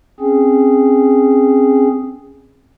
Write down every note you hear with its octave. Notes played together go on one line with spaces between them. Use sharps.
C4 C#4 G#4